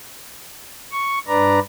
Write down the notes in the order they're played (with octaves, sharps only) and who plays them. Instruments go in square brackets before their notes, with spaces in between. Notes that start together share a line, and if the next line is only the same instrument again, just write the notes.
[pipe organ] C#6
G2 D4 B4 D5 A#5